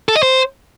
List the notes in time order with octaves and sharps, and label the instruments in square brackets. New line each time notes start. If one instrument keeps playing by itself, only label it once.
[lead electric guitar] A4
D#5
C5